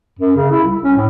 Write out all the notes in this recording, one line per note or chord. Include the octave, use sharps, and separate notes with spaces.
F#2
C#3
E4
C2
C#4
A2